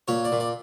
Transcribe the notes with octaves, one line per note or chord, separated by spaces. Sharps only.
A#2 C#5
D5
A#2
D5